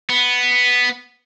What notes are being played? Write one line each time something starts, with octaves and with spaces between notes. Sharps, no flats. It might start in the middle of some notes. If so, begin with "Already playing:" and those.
B3